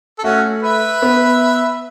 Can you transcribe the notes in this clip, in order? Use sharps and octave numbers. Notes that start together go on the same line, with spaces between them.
A4
A3 C#4 F#4
B4 E5
B3